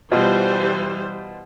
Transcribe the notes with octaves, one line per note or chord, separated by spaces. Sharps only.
B2 E3 G3 F4 C5